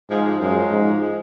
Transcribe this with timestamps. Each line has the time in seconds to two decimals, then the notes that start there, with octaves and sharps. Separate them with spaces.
0.09 G#2 F3 G#3
0.24 F3 G#3
0.40 F#2 F3 G#3
0.71 G#2
1.01 F3 G#3